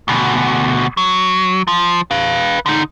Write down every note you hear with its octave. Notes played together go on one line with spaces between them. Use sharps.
D2 B2
F#3
F3
B4 F5
D3 D#4